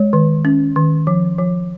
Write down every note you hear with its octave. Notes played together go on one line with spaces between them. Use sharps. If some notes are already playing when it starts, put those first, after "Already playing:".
Already playing: G#3 C#5
D#3
C#4
D#3
F3
F3